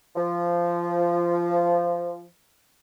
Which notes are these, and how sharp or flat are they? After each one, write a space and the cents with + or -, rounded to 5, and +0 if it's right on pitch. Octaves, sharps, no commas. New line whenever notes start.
F3 -15